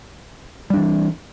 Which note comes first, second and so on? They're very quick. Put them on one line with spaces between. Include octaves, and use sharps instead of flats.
G3 D4 E3